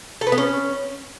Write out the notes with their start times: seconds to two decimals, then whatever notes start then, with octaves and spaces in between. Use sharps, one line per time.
0.21 A4
0.27 B4
0.32 B3
0.38 C#4